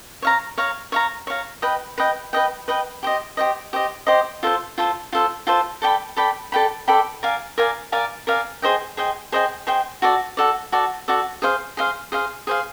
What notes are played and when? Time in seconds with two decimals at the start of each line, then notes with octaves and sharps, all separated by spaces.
0.22 C#5 F5 A#5
0.58 C#5 F5 A#5
0.92 C#5 F5 A#5
1.27 C#5 F5 A#5
1.62 B4 D#5 G5
1.98 B4 D#5 G5
2.33 B4 D#5 G5
2.68 B4 D#5 G5
3.03 G4 C5 D#5
3.37 G4 C5 D#5
3.73 G4 C5 D#5
4.07 G4 C5 D#5
4.43 F4 A4 C5
4.78 F4 A4 C5
5.13 F4 A4 C5
5.47 F4 A4 C5
5.82 A4 D5 G5 B5
6.16 A4 D5 G5 B5
6.52 A4 D5 G5 B5
6.88 A4 D5 G5 B5
7.23 A#4 D5 F5 G#5
7.58 A#4 D5 F5 G#5
7.92 A#4 D5 F5 G#5
8.27 A#4 D5 F5 G#5
8.62 G#4 C5 D#5 G5
8.97 G#4 C5 D#5 G5
9.32 G#4 C5 D#5 G5
9.67 G#4 C5 D#5 G5
10.02 F#4 A4 D5
10.37 F#4 A4 D5
10.72 F#4 A4 D5
11.08 F#4 A4 D5
11.42 G#4 C5 F5
11.77 G#4 C5 F5
12.12 G#4 C5 F5
12.47 G#4 C5 F5